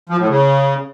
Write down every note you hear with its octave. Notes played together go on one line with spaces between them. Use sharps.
F3
A2
C#3